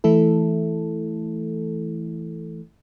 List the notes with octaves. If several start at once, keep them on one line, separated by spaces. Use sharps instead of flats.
E3 A3 E4 A4